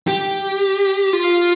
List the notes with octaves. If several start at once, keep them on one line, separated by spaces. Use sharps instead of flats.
G4
F4